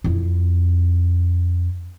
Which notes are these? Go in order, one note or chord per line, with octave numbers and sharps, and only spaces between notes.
F2 E4